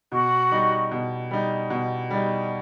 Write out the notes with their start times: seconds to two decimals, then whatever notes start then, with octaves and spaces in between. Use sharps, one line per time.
0.12 B2 F#4
0.51 G3 D#4
0.91 B2
1.31 G3 D#4
1.70 B2
2.11 G3 D#4